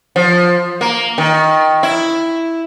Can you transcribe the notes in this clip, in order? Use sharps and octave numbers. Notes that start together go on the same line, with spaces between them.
F3
A#3
D#3
E4